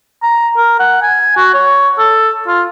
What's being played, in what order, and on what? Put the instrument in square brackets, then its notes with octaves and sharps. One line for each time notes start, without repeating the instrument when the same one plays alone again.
[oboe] A#5
A#4
F#5
G#5
F#4
C#5
A4
F4